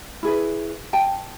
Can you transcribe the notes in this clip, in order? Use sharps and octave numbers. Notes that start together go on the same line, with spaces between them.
E4 G#4 B4
G5 A5